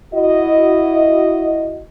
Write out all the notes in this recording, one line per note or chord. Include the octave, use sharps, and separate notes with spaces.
E4 F#4 D#5